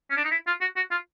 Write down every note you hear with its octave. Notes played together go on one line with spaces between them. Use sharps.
C#4
D4
D#4
E4
F4
F#4
F#4
F4